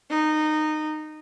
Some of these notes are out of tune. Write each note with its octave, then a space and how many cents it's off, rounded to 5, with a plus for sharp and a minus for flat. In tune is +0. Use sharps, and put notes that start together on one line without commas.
D#4 -15